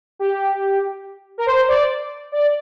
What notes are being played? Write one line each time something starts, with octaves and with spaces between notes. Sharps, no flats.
G4
A#4
C5
D5
D5